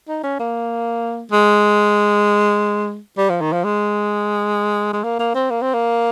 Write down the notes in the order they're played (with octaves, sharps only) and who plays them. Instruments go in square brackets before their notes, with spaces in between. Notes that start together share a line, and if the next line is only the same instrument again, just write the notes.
[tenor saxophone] D#4
C#4
A#3
G#3
G3
F3
D#3
F3
G#3
G#3
A#3
A#3
C4
A#3
C4
A#3